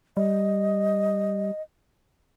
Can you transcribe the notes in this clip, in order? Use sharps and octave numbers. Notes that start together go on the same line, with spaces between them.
G3 D#5